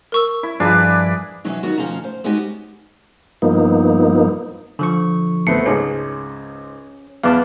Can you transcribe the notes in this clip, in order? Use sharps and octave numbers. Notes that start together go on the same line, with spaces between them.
A#4 C#6 E6
E4
G2 F3 D4 F4 G#4 B4
B2 E3 F#3 C#4 D#4
D#3 G3 B3 F4 F#4 C#5
D2 B2 F3 C#4 F5 A#5
C5
G#3 B3 C#4 D#4 F#4 G4
G2 F3 A#3 B3 D#4
D3 F3 C#6
A1 A3 B3 C4 C7 C#7
C#2 G#2 C#4 G#4
E2 B3 F5 A5 D6